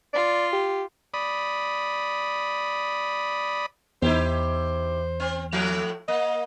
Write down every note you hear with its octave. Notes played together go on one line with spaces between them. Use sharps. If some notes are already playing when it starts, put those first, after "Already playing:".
F4 D5
G4
D5 B5 D#6
E2 D#4 E4 G4 C5
C4
A2 F3 A3
A#3 D#5